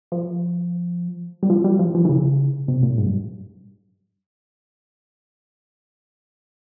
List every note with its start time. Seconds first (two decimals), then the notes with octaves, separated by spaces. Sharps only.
0.12 F3
1.43 G3
1.50 F3
1.64 G3
1.79 F3
1.95 F3
2.05 E3
2.09 C#3
2.68 C3
2.83 A#2
2.98 G#2
3.06 G2